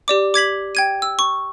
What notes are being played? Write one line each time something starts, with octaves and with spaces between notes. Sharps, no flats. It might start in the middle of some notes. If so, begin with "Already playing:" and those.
G4 D5 D6
D6 G#6 B6 F#7
G5 G#6 D#7
E6
C#6